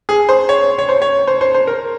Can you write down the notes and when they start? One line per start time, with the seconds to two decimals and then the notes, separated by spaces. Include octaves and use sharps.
0.09 G#4
0.29 C5
0.49 C#5
0.79 C#5
0.89 C5
1.02 C#5
1.27 C5
1.41 C5
1.54 C5
1.67 A#4